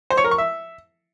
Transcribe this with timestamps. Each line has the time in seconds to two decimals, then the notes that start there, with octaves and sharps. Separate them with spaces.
0.10 C5
0.17 C#5
0.24 A#4
0.31 C#6
0.38 E5